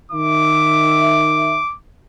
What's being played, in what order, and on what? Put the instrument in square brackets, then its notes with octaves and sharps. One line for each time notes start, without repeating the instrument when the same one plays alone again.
[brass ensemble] D#3 E5 [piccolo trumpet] D6